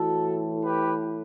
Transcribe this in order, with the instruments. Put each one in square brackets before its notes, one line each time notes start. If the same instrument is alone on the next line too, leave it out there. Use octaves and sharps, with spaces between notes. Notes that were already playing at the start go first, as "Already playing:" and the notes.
Already playing: [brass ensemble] A2 E3 F#4 A4
G4 B4